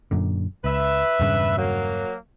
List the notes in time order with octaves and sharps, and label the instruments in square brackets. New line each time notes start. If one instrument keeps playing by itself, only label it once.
[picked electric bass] F#2 A#2 D3
[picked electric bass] C#2 [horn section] B4 E5
[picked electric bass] E1 G2 C#3
[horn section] F#3 A#3